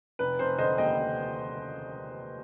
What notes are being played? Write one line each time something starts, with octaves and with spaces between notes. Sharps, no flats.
F1 B4
F1 C5
D3 C5 D#5
D#2 D#5 G5
F1